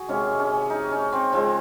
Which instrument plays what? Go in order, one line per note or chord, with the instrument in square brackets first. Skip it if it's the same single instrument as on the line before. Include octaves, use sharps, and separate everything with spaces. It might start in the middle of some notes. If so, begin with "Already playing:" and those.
Already playing: [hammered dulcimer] F#4 G#4
C3 D#3 G#3 C#4
C#4
D#4
C#4
C4
C#3 F3 G#3 C4